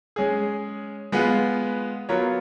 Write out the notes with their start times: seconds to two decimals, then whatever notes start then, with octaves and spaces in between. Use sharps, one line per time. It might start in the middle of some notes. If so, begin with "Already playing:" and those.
0.16 G#3 C#4 G#4
1.12 G#3 B3 F4 B4
2.09 F#3 B3 F4 A#4 C#5